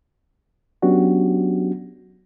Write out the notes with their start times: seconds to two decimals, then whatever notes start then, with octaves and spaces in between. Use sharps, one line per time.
0.82 F#3 B3 C#4 D4 F#4 G4